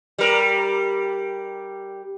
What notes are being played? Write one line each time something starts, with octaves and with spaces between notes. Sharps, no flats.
G3 A#4